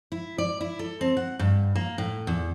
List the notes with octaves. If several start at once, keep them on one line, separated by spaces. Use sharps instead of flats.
E4
D5
E4
A4
C4
F#5
G2
A#3
A2
E2